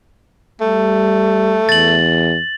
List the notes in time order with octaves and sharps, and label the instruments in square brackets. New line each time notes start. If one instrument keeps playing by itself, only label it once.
[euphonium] G3 [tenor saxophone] A3
[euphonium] E2 [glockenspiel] A6 F#7